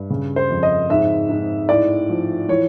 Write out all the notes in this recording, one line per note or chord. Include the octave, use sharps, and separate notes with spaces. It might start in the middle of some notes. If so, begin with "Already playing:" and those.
Already playing: G2
C#3
C5
F2
D#5
G#2 E5
G#2
A2 D5
F3
E3 C#5